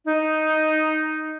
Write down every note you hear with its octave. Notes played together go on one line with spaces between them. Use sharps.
D#4